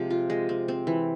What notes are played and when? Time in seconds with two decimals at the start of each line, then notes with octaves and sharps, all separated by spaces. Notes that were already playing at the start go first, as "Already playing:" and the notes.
Already playing: C3 F3 G#3
0.10 F4
0.30 G#3
0.49 C4
0.68 C4
0.87 E3